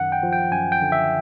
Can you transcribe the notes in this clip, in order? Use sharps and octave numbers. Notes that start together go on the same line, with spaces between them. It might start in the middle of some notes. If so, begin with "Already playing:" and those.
Already playing: F#2 D#3 F#5
G5
F3
G5
F#2 G#5
G5
D3
E5